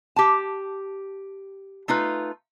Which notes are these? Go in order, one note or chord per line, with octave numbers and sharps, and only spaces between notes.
G4 A5
A3 D#4 F4 B4